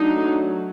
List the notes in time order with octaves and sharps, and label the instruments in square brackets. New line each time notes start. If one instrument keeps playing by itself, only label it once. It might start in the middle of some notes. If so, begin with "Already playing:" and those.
Already playing: [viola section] F#3 A3 D4 D#4